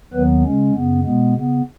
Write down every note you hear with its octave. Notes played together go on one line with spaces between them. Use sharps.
D#2 D#3 F#3 B3 B4
C#3 G#3 C#4
F#2 C#3 B3
B2 G#3 B3
C#3 B3